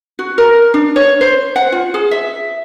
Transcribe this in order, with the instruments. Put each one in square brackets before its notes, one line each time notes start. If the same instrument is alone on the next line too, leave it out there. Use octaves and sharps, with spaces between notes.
[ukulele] F#4
A#4
D4
C#5
C5
F#5
F4
G#4
E5